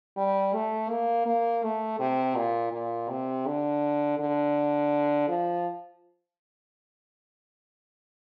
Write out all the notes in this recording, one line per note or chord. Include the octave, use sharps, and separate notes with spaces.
G3
A3
A#3
A#3
A3
C3
A#2
A#2
C3
D3
D3
F3